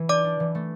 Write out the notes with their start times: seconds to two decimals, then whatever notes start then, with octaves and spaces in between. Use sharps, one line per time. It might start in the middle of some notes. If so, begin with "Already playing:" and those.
Already playing: E3
0.09 D4 D5 D6
0.24 D4
0.40 E3
0.55 A3